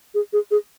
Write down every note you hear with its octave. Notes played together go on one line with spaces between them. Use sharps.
G#4
G#4
G#4